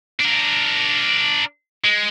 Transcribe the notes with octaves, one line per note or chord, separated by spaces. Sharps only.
D4 A#4
G#3